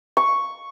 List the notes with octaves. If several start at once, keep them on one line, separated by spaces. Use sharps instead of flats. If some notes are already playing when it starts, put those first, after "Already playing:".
C#6